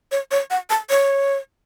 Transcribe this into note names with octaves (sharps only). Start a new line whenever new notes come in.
C#5
C#5
F#5
A5
C#5